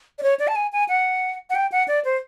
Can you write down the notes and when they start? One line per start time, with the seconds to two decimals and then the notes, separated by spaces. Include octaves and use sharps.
0.19 D5
0.23 C#5
0.39 D5
0.48 A5
0.56 G#5
0.73 G#5
0.89 F#5
1.50 F#5
1.55 G5
1.72 F#5
1.88 D5
2.05 C5